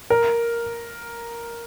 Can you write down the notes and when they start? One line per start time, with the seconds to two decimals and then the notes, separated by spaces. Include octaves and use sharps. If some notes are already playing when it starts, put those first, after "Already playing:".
0.10 A#4